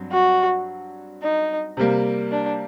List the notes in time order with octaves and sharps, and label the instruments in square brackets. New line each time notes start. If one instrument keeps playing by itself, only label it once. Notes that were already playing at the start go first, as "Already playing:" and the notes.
Already playing: [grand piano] G2 F#3 C4
[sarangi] F#4
D#4
[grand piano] C3 G3 A#3
[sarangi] D4